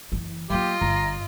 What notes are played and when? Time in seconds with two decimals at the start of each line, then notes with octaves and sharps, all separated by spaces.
0.12 F#1 E3
0.50 F#3 A#3 F4 G4 D#5
0.81 G1 A#5